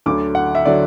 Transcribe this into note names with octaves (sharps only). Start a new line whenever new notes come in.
D2 D3 F#3 D6
F#5
E5
D3 F#3 D5